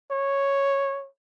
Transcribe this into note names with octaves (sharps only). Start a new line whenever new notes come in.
C#5